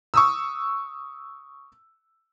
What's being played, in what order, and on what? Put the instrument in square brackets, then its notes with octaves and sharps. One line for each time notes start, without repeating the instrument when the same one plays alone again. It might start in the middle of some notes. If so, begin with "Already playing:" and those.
[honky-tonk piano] C#6 D#6 E6